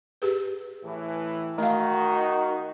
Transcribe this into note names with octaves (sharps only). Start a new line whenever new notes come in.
G4 G#4 B4
A2 E3
D#3 A3 D#4 F#4 F5